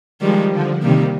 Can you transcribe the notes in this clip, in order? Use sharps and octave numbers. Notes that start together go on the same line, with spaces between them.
D#3 F3 G3 G#3
D3 F3
C3 D#3 G3 A#3